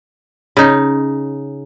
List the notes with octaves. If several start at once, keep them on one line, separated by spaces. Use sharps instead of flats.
C#3 D#4